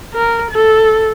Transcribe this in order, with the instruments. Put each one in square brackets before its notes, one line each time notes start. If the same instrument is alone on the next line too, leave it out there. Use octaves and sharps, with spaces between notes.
[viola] A#4
A4